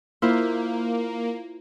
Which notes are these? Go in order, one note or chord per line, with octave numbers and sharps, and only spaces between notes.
A#3 E4 F4 C5